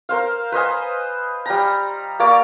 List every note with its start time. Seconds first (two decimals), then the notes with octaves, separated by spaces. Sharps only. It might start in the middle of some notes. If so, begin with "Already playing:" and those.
0.09 A#4 C5 F5
0.52 B4 C5 D#5 G#5
1.46 G3 A#5
2.20 A#3 C#5 D5 D6